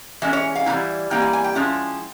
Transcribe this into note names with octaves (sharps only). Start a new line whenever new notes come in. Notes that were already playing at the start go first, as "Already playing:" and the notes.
E3 G#3 C#4 E5
C#5
F5
E3 G3 A#3 E4
E3 G3 A#3 E4 G5
G#5
G#5
G5
F3 G#3 C#4 E4